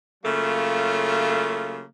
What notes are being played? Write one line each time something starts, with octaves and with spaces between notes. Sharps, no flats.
C#3 F#3 A3 A#3 F4